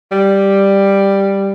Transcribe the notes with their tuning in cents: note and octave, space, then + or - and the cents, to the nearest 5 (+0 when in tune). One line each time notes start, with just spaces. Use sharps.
G3 +5